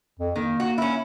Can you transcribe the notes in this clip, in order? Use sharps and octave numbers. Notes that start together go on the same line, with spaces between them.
F2
D#3 A#3
F#4
C#4 E4